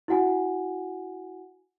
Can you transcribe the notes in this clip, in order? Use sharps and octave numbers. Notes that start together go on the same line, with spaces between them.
E4 F#4 F#5 G#5